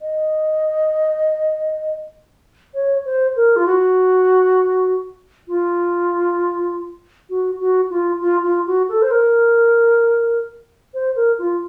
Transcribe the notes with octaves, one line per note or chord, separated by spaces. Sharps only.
D#5
C#5
C5
A#4
F4
F#4
F4
F#4
F#4
F4
F4
F4
F#4
A4
C5
A#4
C5
A#4
F4